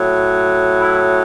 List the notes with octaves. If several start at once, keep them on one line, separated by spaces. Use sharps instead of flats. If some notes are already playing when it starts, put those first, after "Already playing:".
Already playing: A2 F#3
E4